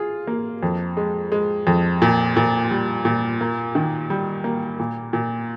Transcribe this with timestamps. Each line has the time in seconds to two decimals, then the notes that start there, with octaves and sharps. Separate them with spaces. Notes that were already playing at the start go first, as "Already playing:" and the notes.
Already playing: F4 G#4
0.27 A#3
0.63 F2
0.97 G#3
1.32 G#3
1.67 F2
2.02 A#2
2.36 A#2
2.71 G3
3.05 A#2
3.41 A#3
3.75 D#3
4.10 G3
4.44 A#3
4.80 A#2
5.13 A#2